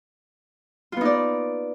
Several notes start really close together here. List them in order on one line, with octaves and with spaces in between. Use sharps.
F4 B3 D#4 D5